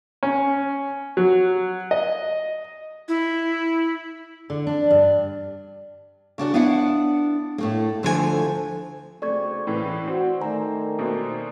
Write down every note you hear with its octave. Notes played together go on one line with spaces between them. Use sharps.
C#4
F#3
D#5
E4
D3
D4
G2
C#3 D4 F#4 A#4
B3 D4 E4 F5 F#5
A2 A3 A#3
D2 D3 F3 A3 F#4 G#5
B1 C#3 A3 C4 D5 C#6 G#6
C#2 A2 E3 B4
C4 F#4
D#3 A3 D5 G#5 A#5
B2 A#3 C4